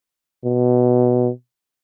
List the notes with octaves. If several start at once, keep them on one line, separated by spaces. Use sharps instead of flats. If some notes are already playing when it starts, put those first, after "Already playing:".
B2